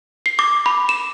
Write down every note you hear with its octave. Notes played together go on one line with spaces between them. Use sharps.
C7
D6
B5
E7